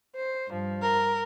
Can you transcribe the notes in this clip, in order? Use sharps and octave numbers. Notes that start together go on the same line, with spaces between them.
C5
G2 F3
A#4